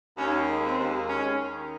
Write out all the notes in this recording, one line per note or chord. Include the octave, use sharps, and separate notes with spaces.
D#2 C#4
G#3
C4
D#2
D#2 C#4
D#3